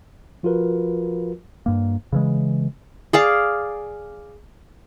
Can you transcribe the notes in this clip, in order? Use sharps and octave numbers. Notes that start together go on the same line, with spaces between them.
F3 F4 F#4 A#4 B4
G2 A#3
C#3 E3 G#3
G#4 D5 F5